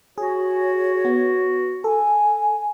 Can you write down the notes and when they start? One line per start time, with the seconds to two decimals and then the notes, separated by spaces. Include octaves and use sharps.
0.18 F#4 G#4 C#5
1.05 B3
1.84 A4 G#5